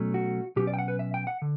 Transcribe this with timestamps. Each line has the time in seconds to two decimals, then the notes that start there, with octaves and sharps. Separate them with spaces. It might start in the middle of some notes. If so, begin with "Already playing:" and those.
Already playing: B2 F#3 A3 C#4
0.14 F#4
0.56 B2 F#3 C#4 G4
0.67 D5
0.74 G5
0.78 F#5
0.88 B4
0.99 E5
1.14 G5
1.27 F#5
1.42 D3